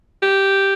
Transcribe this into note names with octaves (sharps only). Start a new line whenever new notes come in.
G4